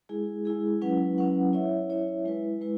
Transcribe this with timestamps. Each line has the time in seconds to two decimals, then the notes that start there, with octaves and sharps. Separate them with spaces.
0.09 G#3 E4 G#4
0.45 G#3 E4 G#4
0.82 F#3 C#4 E4 B4 F#5
1.18 F#3 C#4 E4 B4 F#5
1.53 E4 C#5 E5
1.90 E4 C#5 E5
2.25 G#3 E4 B4
2.61 G#3 E4 B4